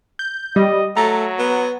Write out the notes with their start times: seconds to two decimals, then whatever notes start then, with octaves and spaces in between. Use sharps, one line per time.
0.19 G6
0.56 G3 D#5
0.97 F#3 A3 A#5
1.39 B3